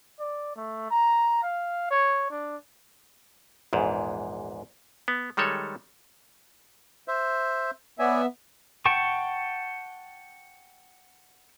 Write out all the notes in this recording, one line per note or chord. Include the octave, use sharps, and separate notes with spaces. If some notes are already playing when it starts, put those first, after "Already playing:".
D5
A3
A#5
F5
C#5
D4
A#1 E2 G#2
B3
D#3 G3 G#3 A4 C#5
C5 E5
B3 C#5 D5 E5 G#5
F#5 G5 A5 C#6